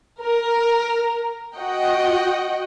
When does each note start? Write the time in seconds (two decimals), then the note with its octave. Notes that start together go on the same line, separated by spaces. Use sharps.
0.19 A#4
1.56 F#4 D#5 F#5 G5